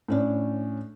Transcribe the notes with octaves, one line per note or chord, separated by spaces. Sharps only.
A2 C#4 D4